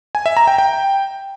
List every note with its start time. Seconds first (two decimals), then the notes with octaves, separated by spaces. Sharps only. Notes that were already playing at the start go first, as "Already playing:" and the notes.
0.15 G#5
0.26 E5
0.37 A#5
0.47 G5
0.58 G5